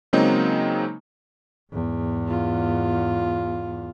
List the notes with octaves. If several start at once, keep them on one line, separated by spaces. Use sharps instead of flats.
C#3 F#3 G#3 A#3 C4 D#4
E2 G#2
F4